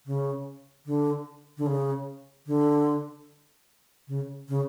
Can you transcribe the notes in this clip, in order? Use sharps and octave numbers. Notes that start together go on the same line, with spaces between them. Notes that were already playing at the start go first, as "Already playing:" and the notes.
C#3
D3
D3
C#3
D3
C#3
C#3